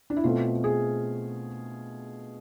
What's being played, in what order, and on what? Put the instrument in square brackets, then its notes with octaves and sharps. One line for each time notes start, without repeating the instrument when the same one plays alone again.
[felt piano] D4
E4
B2 A3 C4 F4
G#4